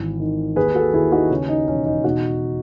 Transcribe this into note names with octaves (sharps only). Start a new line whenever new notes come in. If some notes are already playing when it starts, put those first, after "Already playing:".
Already playing: G#1 E3
D#3
D#2 G#4 B4
F#4 A4
D#2 E4 G#4
D#4 F#4
C#3 C#4
D#4
E1 C#4
D#4
B2 D#4 F#4